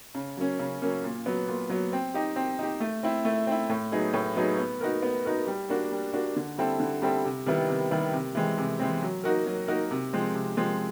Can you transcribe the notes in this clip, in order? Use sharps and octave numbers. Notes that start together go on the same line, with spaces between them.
C#3
F#3 A#3 C#4
C#3
F#3 A#3 C#4
A#2
F#3 B3
A#2
F#3 B3
C4
D#4 G4
C4
D#4 G4
A3
C4 E4
A3
C4 E4
A2
F#3 B3 D#4 G#4
A2
F#3 B3 D#4 G#4
B3
D#4 F#4 A#4
B3
D#4 F#4 A#4
G3
A#3 D4 F#4
G3
A#3 D4 F#4
D3
G3 C4 E4 A4
D3
G3 C4 E4 A4
C3
D#3 G3 B3 E4
C3
D#3 G3 B3 E4
C3
E3 G#3 C4
C3
E3 G#3 C4
F#3
A#3 D#4 F#4 A#4
F#3
A#3 D#4 F#4 A#4
C3
F3 G#3 C4
C3
F3 G#3 C4